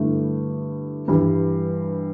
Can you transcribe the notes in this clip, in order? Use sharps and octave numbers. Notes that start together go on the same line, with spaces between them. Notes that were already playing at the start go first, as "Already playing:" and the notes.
Already playing: G2 D3 A3 E4
G2 E3 G3